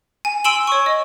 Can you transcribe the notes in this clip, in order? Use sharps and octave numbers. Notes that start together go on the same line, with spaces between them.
G#5
G#5 C6 E6 D7 E7 F#7
C#5 C#6
D#5